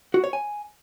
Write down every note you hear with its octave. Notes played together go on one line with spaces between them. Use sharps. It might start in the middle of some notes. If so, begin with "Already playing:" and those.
F#4
C#5
G#5